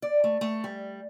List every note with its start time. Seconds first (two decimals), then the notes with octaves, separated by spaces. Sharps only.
0.02 D5
0.24 A3
0.41 A3
0.64 G3